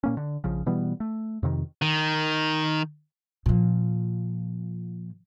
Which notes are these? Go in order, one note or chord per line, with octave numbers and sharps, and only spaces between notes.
A#2 A#3 C#4
D3
A#1 C#3 F3
B2 E3 G3 B3
A3
F2 C3 D#3
D#3
A#2 F3